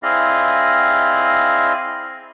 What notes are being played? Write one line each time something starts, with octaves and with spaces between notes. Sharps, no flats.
C4 E4 G#4 D5 D#5 F5